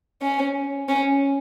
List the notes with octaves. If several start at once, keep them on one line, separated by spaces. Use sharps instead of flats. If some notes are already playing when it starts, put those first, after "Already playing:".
C#4
C#4